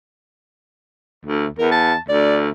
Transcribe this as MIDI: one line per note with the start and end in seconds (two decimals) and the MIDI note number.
1.25 1.46 38
1.58 1.94 40
1.58 1.67 70
1.71 1.97 81
2.09 2.49 38
2.09 2.39 74